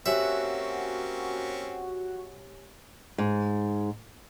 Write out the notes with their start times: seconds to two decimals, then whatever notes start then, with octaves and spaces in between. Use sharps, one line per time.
0.06 A#3 C4 C#4 F#4 G4 C#5 E5 G#5
3.18 G#2